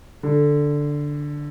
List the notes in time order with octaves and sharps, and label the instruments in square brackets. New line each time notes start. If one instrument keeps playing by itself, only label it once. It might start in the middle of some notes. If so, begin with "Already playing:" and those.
[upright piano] D3